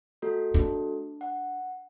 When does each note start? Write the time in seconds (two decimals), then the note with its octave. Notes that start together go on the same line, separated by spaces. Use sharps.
0.22 A3 F#4 A4
0.54 D4
1.21 F#5